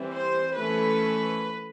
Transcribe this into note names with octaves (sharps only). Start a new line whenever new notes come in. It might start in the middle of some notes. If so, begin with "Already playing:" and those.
Already playing: E3 G3 C4
C5
E3 A3 C#4 B4